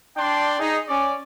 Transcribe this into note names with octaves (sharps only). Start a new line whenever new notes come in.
D4 D5 G5 C6
D#4 G#4
C#4 D5